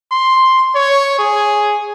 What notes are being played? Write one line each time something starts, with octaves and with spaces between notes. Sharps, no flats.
C6
C#5
G#4